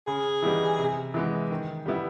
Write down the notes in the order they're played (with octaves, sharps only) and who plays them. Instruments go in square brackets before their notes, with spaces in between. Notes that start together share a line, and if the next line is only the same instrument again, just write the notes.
[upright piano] C#3 [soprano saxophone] G#4
[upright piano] E3 G3 B3 D#4
C3
E3 G#3 B3
D#3
G3 B3 E4